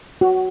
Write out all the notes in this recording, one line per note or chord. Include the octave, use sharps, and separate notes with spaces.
F#4